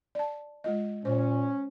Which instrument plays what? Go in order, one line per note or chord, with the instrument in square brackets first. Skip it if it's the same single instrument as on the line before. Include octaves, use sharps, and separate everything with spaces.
[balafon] D5 A5
G#3 F4 D#5
[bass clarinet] A#2 [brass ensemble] C#4 [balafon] C5